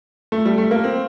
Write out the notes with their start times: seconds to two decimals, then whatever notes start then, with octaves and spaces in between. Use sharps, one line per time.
0.32 A3
0.45 G3
0.58 A3
0.71 A#3
0.84 C4